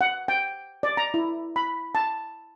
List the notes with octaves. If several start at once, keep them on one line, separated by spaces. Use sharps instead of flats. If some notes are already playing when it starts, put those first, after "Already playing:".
F#5
G5
D5
A#5
E4
B5
A5